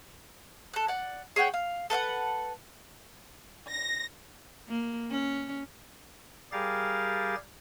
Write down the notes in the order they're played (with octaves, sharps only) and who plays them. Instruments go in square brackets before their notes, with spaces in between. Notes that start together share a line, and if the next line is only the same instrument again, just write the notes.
[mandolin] A4 F#6
D5 F#5
G#4 C#5 F#5 G5
F5
A4 B4 F5 F#5
[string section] A#6
[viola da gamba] A#3
C#4
[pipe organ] G3 G4 G#4 A#4 F5 A6